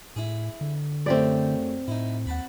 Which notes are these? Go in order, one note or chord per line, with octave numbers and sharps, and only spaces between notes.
A2 E4 G#4
D3
F#2 A3 C4 G4 D5
A2 D#4 E4
D#2 F#5 A5 B5